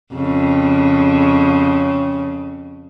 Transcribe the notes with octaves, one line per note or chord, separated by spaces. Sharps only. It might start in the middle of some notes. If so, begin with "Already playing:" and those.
F2 C#3